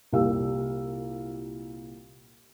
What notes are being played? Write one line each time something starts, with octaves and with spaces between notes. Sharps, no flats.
C2 A#2 G3 G4 F5 E6